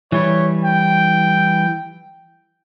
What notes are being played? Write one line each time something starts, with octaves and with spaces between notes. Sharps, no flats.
E3 G3 C#5
G5